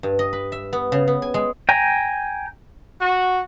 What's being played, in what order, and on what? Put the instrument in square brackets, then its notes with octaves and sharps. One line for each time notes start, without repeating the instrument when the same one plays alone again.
[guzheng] G2
D#5
B4
E5
B3
C#3
B3
G#5
G#3
[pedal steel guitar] G5 G#5 A#5
[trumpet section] F#4